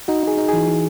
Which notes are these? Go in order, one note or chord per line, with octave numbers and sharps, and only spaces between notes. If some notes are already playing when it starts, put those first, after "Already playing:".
D#4 F#4
D#4 G#4
D#4
E3 G#4
E3